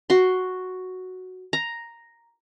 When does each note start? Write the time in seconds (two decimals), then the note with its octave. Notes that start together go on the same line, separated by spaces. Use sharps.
0.10 F#4 C6
1.53 A#5